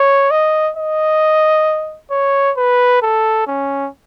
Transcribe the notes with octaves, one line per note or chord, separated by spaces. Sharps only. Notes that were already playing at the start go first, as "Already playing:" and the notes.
Already playing: C#5
D#5
D#5
C#5
B4
A4
C#4